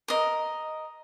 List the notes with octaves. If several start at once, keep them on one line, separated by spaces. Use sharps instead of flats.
A#4 D#5